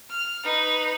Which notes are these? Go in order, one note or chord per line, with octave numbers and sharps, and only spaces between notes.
F6
D#4 B4